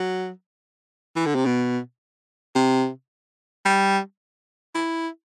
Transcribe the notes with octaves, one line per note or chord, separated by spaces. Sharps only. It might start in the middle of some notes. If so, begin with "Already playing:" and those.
Already playing: F#3
E3
D3
C3
B2
C3
G3
E4